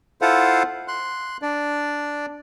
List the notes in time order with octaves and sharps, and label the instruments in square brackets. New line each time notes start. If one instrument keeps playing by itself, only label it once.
[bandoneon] E4 F4 A4 C5 F5 F#5
C6 F#6
D4 D5